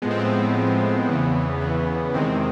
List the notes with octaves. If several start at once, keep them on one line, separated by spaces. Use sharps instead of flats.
A2 F3 G#3 B3
C4
B3
A2 F3 G#3
E2 C#3 E3
E2 C#3 E3
E2 C3 D#3 G#3 C4